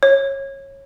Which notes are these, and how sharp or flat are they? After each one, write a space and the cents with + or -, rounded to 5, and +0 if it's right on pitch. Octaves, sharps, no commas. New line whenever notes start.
C#5 -20